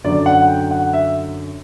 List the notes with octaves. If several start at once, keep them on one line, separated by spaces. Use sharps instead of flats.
F#2 D3 F#3 D5
F#5
G5
F#5
E5